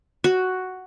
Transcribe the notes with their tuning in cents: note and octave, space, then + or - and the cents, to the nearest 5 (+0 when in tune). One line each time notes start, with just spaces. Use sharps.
F#4 +5